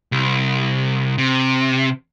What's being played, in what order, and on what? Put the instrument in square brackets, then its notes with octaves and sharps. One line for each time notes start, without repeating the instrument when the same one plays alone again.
[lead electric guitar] C2
C3